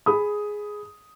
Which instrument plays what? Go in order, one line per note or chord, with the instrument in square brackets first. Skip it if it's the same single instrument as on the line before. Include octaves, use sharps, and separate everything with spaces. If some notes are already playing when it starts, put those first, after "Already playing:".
[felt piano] G#4 B5 D#6